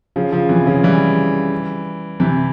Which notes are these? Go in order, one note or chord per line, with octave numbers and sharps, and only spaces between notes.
C#3 F3
C#3 F3
C3 E3
C#3 F3
E3 G3
C3 E3